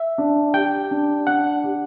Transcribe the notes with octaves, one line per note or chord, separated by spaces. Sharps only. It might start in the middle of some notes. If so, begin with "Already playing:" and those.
Already playing: E5
D4
G4 G5
D4
D4 F#5
G4